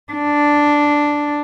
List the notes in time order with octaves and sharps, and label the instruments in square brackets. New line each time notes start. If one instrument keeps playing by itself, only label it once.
[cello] D4